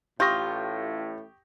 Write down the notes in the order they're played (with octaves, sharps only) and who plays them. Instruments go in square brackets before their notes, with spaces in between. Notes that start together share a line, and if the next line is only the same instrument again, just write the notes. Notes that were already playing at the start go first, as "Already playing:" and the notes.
[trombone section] A1 A2 [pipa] F4 [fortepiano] G4 C#6 D#6 [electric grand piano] G6 A#6